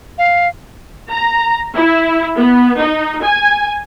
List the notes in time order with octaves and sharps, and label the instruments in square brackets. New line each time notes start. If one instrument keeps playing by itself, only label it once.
[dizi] F5
[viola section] A#5
E4
B3
D#4
G#5